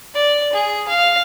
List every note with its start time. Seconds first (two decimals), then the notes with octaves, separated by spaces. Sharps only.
0.14 D5
0.53 G#4
0.88 F5